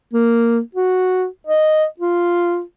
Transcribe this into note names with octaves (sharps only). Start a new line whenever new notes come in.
A#3
F#4
D#5
F4